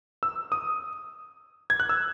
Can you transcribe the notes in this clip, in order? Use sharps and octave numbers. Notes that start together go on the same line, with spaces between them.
E6
D#6
G#6
F#6
E6